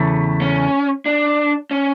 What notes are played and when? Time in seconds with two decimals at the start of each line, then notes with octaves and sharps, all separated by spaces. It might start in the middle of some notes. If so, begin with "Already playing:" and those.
Already playing: E2 C#3 E3 A3
0.41 C#4
1.06 D4
1.71 C#4